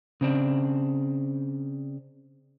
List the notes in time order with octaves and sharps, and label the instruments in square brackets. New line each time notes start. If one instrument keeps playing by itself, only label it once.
[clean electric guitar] C#3 C4 D4